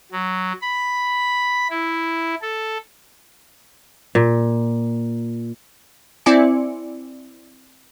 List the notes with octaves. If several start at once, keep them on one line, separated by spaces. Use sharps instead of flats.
F#3
B5
E4
A4
A#2
C4 E4 D5 G#5 C#7